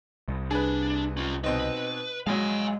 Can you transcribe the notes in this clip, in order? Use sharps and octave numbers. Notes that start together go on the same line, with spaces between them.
C2
D4 G#4 B4
C#4 F4
B2 C4 D#4 B4
A#1 F#3 G#3 F5 G#5